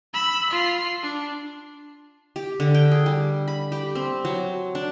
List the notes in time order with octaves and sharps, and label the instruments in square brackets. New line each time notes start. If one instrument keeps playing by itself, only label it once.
[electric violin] B5 E6
F4 C7
D4
[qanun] G4
D3
G5
G#4
G3
B5
G4
C4
F#3
D4